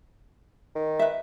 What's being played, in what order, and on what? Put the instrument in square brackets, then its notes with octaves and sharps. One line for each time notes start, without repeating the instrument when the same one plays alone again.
[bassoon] D#3
[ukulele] B4 E5